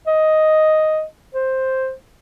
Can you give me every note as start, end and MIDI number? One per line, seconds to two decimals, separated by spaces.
0.07 1.03 75
1.34 1.93 72